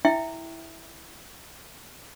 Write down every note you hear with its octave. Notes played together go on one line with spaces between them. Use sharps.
E4 E5 G5